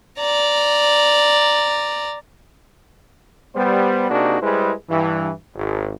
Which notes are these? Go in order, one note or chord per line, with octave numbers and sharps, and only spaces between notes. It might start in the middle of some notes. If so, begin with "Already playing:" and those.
D5 A#5
G3 B3 C5
C3 A#3 D4 D#4 F#4 G#4
G3 G#3 E4 G#4 B4 C5
G2 E3
G#1